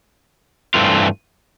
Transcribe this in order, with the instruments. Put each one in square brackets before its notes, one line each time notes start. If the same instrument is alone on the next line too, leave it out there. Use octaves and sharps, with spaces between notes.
[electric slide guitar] G2 E3 A3 C4 F4